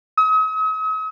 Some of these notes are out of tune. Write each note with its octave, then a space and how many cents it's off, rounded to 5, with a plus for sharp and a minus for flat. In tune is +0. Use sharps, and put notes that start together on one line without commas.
D#6 +45